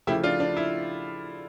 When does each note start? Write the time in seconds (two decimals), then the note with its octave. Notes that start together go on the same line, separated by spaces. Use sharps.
0.07 C#3 F3 A3 E4 G4
0.24 D4 F4
0.40 D4
0.57 E4